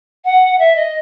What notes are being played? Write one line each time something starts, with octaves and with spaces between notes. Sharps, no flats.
F#5
E5
D#5